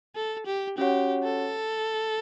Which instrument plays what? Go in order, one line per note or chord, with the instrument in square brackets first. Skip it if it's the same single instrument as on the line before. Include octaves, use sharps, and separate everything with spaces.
[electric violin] A4
G4
[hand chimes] C#4 F#4 C#5 F#5 [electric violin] G4
[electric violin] A4